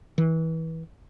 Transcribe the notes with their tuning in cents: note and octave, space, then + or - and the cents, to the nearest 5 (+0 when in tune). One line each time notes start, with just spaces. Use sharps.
E3 -25